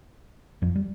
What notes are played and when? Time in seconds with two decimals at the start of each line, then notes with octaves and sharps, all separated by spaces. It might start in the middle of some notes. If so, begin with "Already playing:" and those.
0.62 F2 F3
0.76 G3